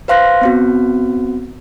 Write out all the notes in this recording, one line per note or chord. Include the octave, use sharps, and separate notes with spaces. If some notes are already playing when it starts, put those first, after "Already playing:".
B4 C5 F5 C6 F#6 A#6
B3 C4 F#4